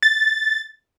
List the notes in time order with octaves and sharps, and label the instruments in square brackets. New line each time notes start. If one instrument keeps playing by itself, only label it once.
[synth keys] A6